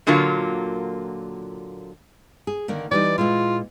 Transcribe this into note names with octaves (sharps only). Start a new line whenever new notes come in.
A#2 D3 F#3 A#3 F4
G#4
D3 D#3 A#3
E3 G3 D#4 D5
A#2 G#3 E4 F4